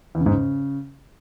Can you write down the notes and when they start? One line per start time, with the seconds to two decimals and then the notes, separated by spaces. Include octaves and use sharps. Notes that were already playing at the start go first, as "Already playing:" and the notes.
0.15 E2
0.20 C#3
0.26 G#2
0.32 C#3